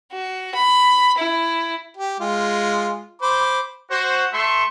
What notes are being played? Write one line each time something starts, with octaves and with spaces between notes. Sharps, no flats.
F#4
B5
E4
G4
G#3 F4
C5 B5 D6
F#4 C5
A3 E5 C6 C#6